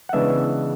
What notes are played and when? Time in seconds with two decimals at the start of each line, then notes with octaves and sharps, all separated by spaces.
0.09 F#5
0.13 C#3 E3 G#3 B3 D4 E5